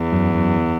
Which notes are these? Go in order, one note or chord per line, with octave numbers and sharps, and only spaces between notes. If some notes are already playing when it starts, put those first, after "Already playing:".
Already playing: E2
F#2
F#2